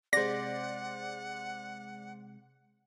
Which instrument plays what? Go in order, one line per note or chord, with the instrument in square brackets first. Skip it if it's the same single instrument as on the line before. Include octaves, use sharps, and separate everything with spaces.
[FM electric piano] C3 G#3 [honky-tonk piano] C5 D5 [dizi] F#5 [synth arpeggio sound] A#6